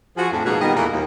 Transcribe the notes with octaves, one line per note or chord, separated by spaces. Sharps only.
F3 F#4 G#4
F2 A2 D4
G#2 B2 F3 A#3 F#4 G#4
B2 D#3 G3 B3 D#5
E2 A#2 E3 A3 A#3 A#4
D#2